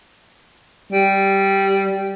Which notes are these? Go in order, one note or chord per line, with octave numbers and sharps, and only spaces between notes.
G3